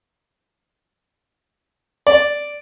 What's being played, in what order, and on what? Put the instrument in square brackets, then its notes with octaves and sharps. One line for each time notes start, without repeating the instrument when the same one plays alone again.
[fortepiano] D5